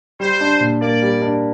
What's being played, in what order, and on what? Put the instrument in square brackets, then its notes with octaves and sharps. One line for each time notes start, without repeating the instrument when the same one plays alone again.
[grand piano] G3 [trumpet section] C5
[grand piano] D4
A#2
[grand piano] A#3 [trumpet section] D5
[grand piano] G3
D4